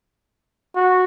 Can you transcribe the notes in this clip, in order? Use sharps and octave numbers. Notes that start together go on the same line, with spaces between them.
F#4